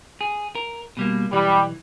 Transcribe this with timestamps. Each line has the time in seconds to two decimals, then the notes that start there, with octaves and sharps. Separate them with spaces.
0.21 G#4
0.55 A#4
0.97 B2 G3 A#3
1.32 B1 E3 G3